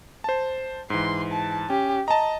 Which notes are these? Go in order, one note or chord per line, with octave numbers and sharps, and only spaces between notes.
C5 A5
G#2 E3 C6
A5
C#4 G4
D#5 A5 A#5